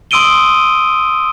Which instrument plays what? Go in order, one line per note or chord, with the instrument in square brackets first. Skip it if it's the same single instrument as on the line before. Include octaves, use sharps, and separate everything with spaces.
[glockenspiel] C6 D#6 E6 D7 D#7 G7